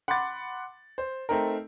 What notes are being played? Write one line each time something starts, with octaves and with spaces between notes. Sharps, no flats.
F#5 B5 C6 D6 A6
C5
A3 C4 D#4 A#4